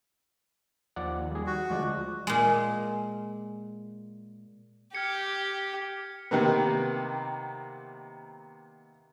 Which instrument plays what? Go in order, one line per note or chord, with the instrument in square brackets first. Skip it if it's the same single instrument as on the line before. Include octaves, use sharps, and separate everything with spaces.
[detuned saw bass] D#2 [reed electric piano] F3 D5 F#5
[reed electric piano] G3 G#4
[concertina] F#4
[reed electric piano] D2 G#3 D5 [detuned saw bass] F3
[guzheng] A#2 G#3
[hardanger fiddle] G4 [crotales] F6 G#6 C#7
[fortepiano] C3 D#3 A#3 B3